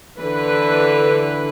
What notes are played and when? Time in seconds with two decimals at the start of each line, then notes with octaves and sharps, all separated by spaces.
0.17 D3 E3 B4